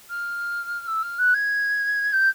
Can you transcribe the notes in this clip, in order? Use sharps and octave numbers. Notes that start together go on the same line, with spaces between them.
F6
E6
F6
F#6
G#6
G6